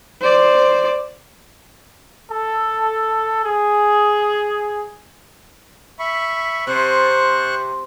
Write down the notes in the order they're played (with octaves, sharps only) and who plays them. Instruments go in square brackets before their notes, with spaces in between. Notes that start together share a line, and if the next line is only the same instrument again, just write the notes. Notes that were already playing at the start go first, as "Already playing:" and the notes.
[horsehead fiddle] C5 D5
[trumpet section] A4
G#4
[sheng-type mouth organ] E5 B5 C#6
[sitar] C3 [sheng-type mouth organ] C5 C#6 F#6